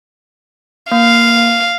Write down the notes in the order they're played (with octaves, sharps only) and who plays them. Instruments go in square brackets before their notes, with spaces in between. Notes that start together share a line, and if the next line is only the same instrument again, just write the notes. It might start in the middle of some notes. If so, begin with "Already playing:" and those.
[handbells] A#3 [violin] F5